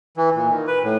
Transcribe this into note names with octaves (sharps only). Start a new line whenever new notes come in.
E3
A#2
D#3
B4
A2